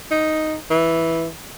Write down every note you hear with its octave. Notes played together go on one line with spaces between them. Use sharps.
D#4
E3